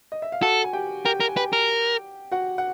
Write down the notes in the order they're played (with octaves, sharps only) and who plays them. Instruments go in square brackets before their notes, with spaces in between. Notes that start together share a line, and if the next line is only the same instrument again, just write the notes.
[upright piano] D#5
E5
F5
[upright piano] F#4 F#5 [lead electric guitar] A4
[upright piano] G#5
G4 G5
[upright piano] G4 G5 [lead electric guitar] A#4
[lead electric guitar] A#4
[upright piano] G#5
[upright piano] G4 G5 [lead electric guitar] B4
[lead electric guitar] A#4
[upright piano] F#4 F#5
F#5